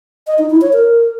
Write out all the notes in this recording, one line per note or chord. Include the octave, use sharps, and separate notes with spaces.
D#5
D#4
E4
C#5
A#4